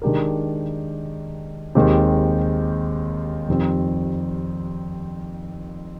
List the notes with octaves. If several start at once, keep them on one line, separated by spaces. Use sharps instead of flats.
D#3 G#3 D4 G4 A#4
D#2 D#3 G#3 C4 G4
F2 D#3 G3 C4